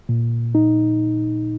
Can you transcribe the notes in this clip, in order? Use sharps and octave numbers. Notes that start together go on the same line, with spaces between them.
A#2
D#4